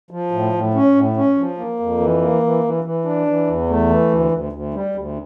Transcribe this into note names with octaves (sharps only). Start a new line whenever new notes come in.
F3
A2
A2
C#4
A2
C#4
F3
A#3
F2
E3
A#3
E3
E3
E3
D4
E3
E2
A3
E3
D2
D2
D2
G3
D2